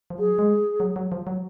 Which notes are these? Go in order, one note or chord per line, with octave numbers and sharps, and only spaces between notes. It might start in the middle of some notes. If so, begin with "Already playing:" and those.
F3
F#3 G#4
G#3
F#3
F#3
F3
F#3